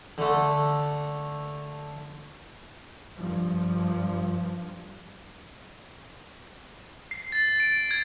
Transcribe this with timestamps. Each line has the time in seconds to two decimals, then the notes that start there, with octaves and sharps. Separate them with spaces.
0.18 D3 A3
3.16 G2 F3
7.11 C7
7.32 A6
7.60 D7
7.91 G#6